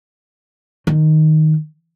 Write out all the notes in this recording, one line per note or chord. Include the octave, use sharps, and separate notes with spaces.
D#3